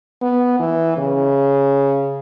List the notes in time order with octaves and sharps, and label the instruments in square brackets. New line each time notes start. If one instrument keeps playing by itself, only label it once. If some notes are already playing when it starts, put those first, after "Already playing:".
[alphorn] B3
E3
C#3